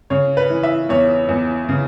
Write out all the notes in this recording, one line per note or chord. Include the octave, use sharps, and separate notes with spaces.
C#3 C#5
B4
E3
E5
E2 C#5
E2
C#3